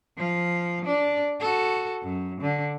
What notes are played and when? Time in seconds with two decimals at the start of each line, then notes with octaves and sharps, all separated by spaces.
0.18 F3 F5
0.85 D4 D5
1.40 F#4 A4
2.03 F#2
2.41 D3